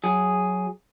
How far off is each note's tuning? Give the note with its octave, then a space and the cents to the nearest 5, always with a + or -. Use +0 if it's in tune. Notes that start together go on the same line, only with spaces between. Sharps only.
F#3 +0 G#4 +0